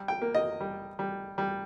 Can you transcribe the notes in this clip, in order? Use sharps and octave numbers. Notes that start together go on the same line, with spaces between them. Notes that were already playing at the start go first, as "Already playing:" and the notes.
Already playing: G3
G5
A#3
D#5
G3
G3
G3